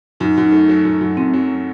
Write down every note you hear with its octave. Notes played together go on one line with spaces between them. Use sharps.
F#2 D#4
F#2
D#4
A3
F#3
F#2
F#2
F#2 C4
F#3